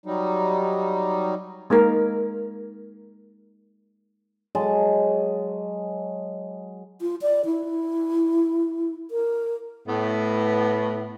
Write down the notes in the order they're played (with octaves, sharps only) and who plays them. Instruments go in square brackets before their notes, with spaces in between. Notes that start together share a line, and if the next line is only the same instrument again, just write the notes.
[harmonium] F#3 G3 D#4
[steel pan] G#3 A#3 D#4 A#4
[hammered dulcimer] F#3 G#3 A5
[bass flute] F4
D5
E4
A#4
[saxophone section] A2 B3